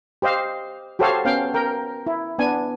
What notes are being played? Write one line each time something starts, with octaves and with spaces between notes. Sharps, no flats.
G4 C5 D#5 F5
F#4 G4 A4 C5 C#5 F5
B3 C#4 F5 G5
A#4 G5
E4
B3 D4 G#5